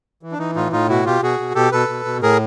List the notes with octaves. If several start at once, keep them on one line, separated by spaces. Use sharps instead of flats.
E3
D4
E3 D#4
A2 D#4 F4
A2 D#4 F4
B2 E4 F#4
B2 F4 G4
B2 F#4 G#4
B2
B2 G4 A4
B2 A4 B4
B2
B2
A2 G#4 A#4